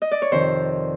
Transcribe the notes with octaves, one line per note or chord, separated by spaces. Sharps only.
D#5
D5
C#5
F2 C3 D#3 C5